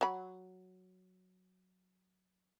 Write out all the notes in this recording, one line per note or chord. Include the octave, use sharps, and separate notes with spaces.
F#3 B5